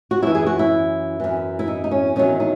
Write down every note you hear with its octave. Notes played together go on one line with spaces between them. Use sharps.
F#4
F#2 E3 E4
G#4
F#4
E4
F#2 E3
E4
D#4
D#4
C#4
E2 D#3 F#3 C#4
D#4